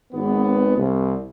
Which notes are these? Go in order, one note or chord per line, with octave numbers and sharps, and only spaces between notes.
G#1 B3
C2